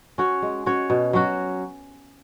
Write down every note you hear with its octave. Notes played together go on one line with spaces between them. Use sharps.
C#4 F#4 C#5
G#3
C#4 F#4 C#5
B2
F#3 C#4 F#4